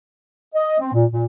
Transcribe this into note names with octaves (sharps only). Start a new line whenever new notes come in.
D#5
C4
A#2
A#2